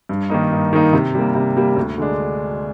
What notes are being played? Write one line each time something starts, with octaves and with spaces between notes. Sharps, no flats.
G2
D#3 A#3 D#4
G2
D#3 A#3 D#4
C3
G3 A#3
C3
G3 A#3
D2
D3 G#3 D4